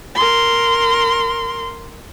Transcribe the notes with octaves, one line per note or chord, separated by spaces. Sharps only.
A#4 C6